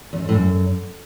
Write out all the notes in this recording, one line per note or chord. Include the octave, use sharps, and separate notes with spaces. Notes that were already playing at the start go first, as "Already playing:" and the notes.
E2
F#2
F2
A2
F#2